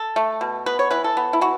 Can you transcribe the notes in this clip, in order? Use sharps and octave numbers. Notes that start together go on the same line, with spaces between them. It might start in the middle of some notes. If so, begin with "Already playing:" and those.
Already playing: A4
A3
B2
B3 B4
C#5
E3 B4
A4
B3
E4
E3 F#4